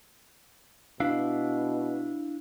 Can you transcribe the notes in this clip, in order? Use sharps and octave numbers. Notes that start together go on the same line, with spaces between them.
B2 D4 E4 F5